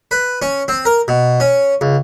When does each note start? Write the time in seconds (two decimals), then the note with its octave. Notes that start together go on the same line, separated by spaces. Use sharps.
0.11 B4
0.42 C#4
0.68 C4
0.85 A#4
1.08 B2
1.40 C#4
1.81 C#2